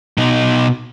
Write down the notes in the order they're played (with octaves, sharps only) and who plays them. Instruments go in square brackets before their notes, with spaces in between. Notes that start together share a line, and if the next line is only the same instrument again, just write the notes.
[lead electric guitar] B2 D#4